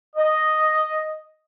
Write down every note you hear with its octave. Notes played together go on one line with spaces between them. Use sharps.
D#5